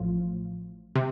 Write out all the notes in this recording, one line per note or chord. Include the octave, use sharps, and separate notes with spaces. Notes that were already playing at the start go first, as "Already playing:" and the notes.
Already playing: A1 A2 F3 F4
C3